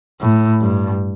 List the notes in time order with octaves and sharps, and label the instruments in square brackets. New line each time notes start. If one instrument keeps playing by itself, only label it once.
[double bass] A2
G2